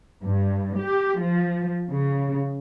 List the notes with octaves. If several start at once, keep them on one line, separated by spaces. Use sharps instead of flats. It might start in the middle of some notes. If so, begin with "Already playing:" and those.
G2
G4
F3
C#3